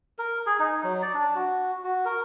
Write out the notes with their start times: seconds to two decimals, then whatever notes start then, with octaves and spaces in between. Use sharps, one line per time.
0.19 A#4
0.46 G#4
0.59 D#4
0.84 F#3
1.02 D5
1.14 D4
1.35 F#4
1.84 F#4
2.05 A#4